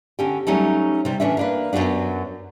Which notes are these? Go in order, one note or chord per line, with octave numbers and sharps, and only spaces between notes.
D3 C#4 G4
F#3 G3 A3 C#4 D#4
C3 G3
A2 E3 C#4 D4 E5
A#3 D4 B4
F#2 A#2 F#3 B3 D4